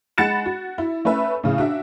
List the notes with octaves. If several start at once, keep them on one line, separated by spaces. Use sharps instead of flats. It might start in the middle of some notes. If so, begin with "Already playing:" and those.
G#3 F#5 B5 A6 C#7 E7
F#4
E4
A3 C#4 B4 E5
A2 C#3
D4 F#4 E5